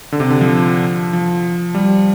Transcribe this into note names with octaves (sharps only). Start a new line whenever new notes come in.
D3
C3
D3
F3
F3
G3